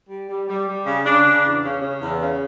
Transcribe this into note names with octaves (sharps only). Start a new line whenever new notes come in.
G3
G3
G3
G3
C#3
C#3 D4
C#3
E2
C#3
C#3
E2
C#3